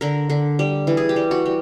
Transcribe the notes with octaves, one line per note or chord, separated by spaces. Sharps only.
D3 A#4
D3
G3
E3
G#4
G4
G3
F#4
G3